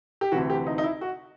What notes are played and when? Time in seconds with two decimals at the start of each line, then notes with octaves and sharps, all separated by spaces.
0.21 G4
0.32 D2 C3 E3 F#4
0.50 G4
0.67 D#4
0.78 D#4
0.84 E4
1.01 F#4